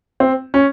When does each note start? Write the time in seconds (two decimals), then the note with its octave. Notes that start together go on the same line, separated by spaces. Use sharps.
0.20 C4
0.54 C#4